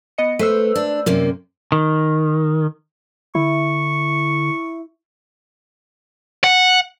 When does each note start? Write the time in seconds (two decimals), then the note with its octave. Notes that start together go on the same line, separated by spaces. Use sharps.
0.18 B3 D#5 C#7
0.39 A3 B4 C5 E6
0.75 D4
1.06 F#2 C3 A#3
1.72 D#3
3.35 D3 E4 C#6
6.44 F#5